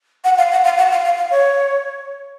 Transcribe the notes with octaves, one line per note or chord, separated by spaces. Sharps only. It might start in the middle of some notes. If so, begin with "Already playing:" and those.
F#5
F5
F#5
F5
F#5
F5
F5
F5
C#5